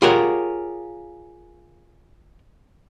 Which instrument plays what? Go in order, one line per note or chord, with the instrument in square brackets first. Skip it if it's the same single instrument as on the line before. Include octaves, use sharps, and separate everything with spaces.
[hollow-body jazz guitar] F4 G4 G#4 A#4 C#5 F#5